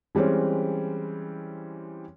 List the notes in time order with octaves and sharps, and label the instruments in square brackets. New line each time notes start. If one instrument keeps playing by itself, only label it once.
[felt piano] E3 G3 G#3 C4 C#4